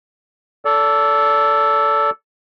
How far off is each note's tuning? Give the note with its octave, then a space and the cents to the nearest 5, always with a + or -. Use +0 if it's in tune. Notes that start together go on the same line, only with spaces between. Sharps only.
A4 +0 D5 -35